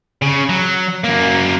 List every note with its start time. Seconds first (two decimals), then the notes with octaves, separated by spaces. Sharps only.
0.22 C#3
0.49 F#3
1.04 F#2 A#3